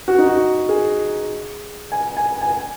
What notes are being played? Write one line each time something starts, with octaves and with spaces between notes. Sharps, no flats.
F#4
D#4
F#4
G#4
G#5
G#5
G#5